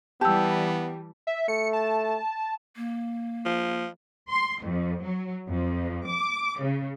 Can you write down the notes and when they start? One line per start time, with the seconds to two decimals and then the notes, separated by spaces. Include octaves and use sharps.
0.21 E3 G3 B3 G4 A5 E6
1.27 E5
1.48 A3 C#7
1.73 A5
2.76 A#3
3.45 F3
4.29 C6
4.63 F2
5.03 F#3
5.48 F2
6.08 D6
6.62 C#3